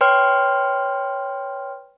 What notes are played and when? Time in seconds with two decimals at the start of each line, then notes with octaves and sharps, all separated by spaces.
0.01 B4 C#5 G5 C6 F6